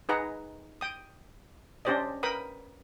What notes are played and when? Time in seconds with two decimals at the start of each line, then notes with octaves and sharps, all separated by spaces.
0.09 D#4 G#4 B4 F#5 A#5
0.81 G5 D#6
1.85 C#4 D4 G4 C5 D5 D#5
2.23 A#4 B4 G5 B5 D#6